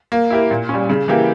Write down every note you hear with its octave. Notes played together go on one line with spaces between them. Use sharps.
A#3
E4 G4 A#4
A#2
G3 C#4
C#3
E3 A#3 E4 G4